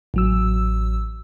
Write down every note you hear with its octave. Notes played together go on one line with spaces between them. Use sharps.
A1 F#3 E6